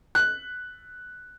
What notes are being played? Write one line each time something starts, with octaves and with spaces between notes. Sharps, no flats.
F#6